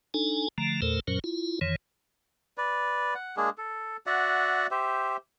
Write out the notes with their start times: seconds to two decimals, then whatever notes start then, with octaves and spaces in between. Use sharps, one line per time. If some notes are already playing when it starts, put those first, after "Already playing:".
0.14 D4 D#4 A4 G#5
0.58 D3 F3 A3 A#5
0.82 E2 A#2 A3 A4 A#4 C5
1.07 F#2 A#2 F#3 C#4 A#4 C5
1.24 E4 F4
1.61 F2 D#3 E3 C#5
2.58 B4 D5
3.15 F#5
3.37 G#3 A#3 D4 G#4
3.58 A4
4.06 F#4 D5 E5 F#5
4.71 G4 C5 E5